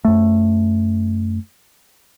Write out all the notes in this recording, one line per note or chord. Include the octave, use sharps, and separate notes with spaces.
F#2 A3